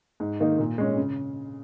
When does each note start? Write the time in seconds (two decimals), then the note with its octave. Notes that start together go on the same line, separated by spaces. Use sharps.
0.20 G#2
0.40 D#3 A#3 D#4
0.59 A#2
0.78 G#3 C#4
0.97 C#3